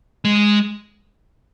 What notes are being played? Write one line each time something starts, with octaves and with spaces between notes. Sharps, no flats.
G#3